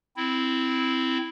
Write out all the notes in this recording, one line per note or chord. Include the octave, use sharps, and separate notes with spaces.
C4 E4